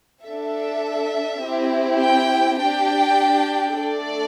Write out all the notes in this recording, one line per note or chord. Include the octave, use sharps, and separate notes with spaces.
D4 A4 E5
C4 E4 G4
G5
D4 G4 G5
A3 D4 A4 D5